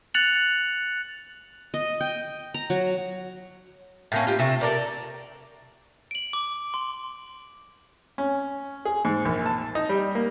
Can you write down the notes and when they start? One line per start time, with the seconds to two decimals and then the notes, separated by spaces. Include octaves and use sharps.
0.14 F#6 A6 C#7 F7 F#7
1.74 D#5
2.01 G5
2.54 A#5
2.70 F#3
4.12 A2 A#3 C#4
4.26 D4 F4 G4
4.39 C3 A3
4.61 A4 A#4 D5
6.11 D7 F#7
6.33 D6
6.74 C6
8.18 C#4
8.85 G#4
9.05 G#2
9.25 A#1
9.46 A5
9.75 D#4
9.89 G3
10.15 A#3